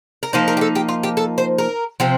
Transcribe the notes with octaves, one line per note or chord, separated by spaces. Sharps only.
A#4
F3 A#3 D#4 C5
A#4
G4
A4
G4
F4
G4
A4
C5
A#4
C3 F3 C4